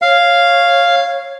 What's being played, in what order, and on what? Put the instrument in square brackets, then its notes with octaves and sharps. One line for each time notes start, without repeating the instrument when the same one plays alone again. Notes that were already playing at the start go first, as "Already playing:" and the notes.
[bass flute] C#5 [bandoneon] F5